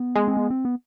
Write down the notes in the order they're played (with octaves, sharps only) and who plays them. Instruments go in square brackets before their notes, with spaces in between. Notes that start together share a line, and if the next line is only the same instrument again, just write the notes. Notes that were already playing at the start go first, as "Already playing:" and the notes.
Already playing: [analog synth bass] B3
[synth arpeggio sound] G#3
[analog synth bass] C4
B3
C4
B3